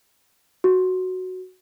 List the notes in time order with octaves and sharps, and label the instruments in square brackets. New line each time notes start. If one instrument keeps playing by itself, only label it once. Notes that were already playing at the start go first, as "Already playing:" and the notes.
[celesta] F#4